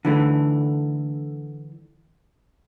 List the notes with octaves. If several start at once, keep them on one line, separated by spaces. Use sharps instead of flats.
D3 E3 A3